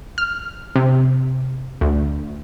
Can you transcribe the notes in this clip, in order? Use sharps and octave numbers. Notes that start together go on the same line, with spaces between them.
F6
C3
D2